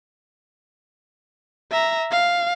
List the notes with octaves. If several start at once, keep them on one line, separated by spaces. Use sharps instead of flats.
E5 A#5
F5